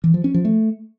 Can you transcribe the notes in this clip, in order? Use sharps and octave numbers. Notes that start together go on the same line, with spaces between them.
E3
F3
C#4
F3
A3